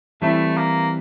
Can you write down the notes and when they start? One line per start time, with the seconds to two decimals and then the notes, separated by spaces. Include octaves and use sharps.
0.22 E3 G3 A3 C4 E4
0.57 A#3